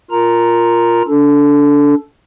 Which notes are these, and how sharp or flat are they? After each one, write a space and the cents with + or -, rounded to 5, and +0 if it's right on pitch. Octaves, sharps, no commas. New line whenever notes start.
F4 +0 A#4 +0 A#5 +0
D4 -25 A4 +0